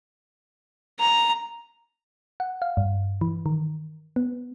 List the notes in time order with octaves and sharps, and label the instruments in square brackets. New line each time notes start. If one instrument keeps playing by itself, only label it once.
[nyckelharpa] A#5
[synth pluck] F#5
F5
G2
E3
D#3
B3